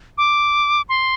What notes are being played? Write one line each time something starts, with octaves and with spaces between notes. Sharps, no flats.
D6
C6